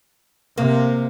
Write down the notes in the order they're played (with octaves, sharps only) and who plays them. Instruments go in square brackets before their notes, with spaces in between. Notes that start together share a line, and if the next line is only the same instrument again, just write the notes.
[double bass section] C3 [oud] A#3